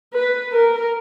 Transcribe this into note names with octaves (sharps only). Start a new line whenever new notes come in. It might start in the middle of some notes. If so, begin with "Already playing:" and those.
B4
A#4